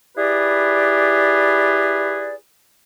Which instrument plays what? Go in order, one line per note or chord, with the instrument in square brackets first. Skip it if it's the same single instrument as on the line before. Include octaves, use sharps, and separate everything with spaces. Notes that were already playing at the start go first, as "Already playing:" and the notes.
[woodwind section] E4 G4 G#4 B4 D5